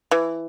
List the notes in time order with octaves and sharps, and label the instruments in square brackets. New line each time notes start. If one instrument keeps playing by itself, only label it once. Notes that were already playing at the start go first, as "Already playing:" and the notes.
[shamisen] E3